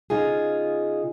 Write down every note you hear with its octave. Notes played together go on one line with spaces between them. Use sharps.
C#3 D#4 F4 G#4